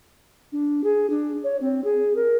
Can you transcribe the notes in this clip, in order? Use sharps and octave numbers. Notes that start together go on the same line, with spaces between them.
D4
G#4
D4
C#5
C4
G#4
A#4